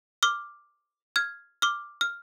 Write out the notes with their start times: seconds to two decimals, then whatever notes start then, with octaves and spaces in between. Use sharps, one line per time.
0.23 D6 F6
1.16 F6 G#6
1.62 D6 F6
2.01 F6